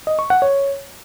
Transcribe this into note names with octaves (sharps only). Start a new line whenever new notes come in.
D#5
C#6
F#5
C#5